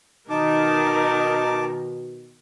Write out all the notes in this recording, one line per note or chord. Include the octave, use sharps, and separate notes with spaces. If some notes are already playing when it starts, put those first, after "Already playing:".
B2 D#3 D#4 A#4 A5 D6